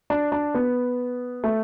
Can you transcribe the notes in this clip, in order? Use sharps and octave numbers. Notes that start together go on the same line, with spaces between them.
D4
D4
B3
A3